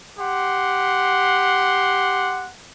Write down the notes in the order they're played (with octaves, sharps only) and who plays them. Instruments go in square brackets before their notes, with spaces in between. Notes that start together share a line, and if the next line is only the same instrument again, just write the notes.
[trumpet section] G4 F#5 C6